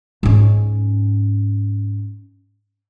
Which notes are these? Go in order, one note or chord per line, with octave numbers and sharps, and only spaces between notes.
G#2 C#4